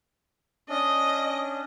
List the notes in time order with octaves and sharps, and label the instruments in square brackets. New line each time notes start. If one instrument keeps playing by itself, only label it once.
[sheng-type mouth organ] C#4 D4 [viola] D#5